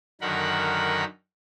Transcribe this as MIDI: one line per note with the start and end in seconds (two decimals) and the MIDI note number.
0.21 1.04 42
0.21 1.04 50
0.21 1.04 51
0.21 1.04 70
0.21 1.04 78
0.21 1.04 83